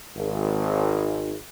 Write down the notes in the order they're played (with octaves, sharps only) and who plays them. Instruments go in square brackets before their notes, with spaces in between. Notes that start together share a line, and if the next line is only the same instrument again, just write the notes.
[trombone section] G#1